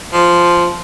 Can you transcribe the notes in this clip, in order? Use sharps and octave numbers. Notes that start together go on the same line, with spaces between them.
F3